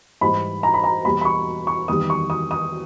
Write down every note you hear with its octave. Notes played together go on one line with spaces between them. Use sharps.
G#2 E3 G3 B5
A#5
B5
A#5
E2 B2 G3 B5
B5
C#6
C#6
E2 D#3 G3 D#6
C#6
D#6
D#6